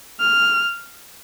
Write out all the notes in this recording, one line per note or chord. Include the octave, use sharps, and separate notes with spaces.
F6